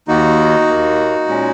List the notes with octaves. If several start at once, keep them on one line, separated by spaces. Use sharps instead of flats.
D#2 D#3 A#3 D#4 F#4
D#2 D#3 A#3
A#2 G#3 C#4